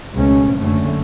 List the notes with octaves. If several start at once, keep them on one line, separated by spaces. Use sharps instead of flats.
C#2 B2 A3 C#4
F#1 F#2 D3 A3 C#4